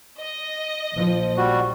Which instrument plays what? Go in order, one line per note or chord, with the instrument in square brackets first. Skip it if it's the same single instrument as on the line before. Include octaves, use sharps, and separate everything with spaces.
[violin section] D#5
[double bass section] A#1 F3
[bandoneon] G3 F#4